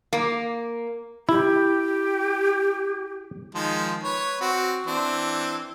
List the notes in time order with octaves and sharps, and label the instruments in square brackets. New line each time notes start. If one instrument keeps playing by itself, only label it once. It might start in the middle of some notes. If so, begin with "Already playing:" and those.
[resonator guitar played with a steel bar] A#3
[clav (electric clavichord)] E4 [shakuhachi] G4
[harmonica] D#3 F3 G#3
B4 C#5
C4 F#4
E3 C4 D4